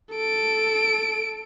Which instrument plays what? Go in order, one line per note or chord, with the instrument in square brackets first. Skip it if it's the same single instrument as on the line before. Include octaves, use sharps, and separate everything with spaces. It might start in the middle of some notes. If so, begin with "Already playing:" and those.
[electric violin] A4 D7